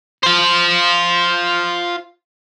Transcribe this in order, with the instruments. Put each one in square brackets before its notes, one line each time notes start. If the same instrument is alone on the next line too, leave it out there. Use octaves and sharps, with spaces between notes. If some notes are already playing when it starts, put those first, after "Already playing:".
[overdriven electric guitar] F4 C5